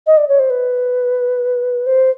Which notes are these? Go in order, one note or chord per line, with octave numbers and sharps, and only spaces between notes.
D#5
D5
C#5
C5
B4
C5